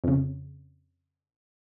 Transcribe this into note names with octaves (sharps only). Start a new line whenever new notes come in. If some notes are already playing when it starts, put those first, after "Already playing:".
F2 C#3